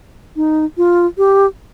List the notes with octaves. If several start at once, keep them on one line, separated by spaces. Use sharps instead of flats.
D#4
F4
G4